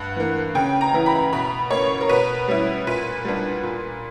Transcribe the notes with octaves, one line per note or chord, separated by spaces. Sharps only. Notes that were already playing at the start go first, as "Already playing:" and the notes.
Already playing: G2 F#5
E3 A#3
C#3 G5
A#5
E3 B3 E4
B5
B2 B5
A#3 C#4 C#5
A#4
B2 B4
G3 C#4 E4
A#2 B4
G3 B3 D4
A#2